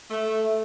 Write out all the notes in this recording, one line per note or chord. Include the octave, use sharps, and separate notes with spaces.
A3